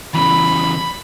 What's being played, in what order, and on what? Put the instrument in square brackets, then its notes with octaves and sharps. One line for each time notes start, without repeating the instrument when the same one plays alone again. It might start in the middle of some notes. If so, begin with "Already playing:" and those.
[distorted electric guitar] C#3 E3 [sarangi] B5